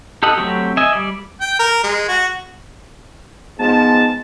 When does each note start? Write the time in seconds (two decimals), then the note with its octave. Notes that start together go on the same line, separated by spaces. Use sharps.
0.23 G4 A4 D#5 F#5
0.38 F#3 A3 C4 F#4 G4
0.77 D#5 E5 G#5
0.93 G3 D5
1.41 G5
1.59 A#4
1.84 G#3
2.08 F#4
3.59 G#2 F3 B3 A5